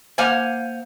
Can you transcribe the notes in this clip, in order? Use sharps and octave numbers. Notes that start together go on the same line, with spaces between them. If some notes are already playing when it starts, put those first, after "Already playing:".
A#3 C5 F5 F#5 G#5